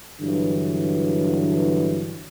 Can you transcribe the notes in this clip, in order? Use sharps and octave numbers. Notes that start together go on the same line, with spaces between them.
G2 D3 E3 F#3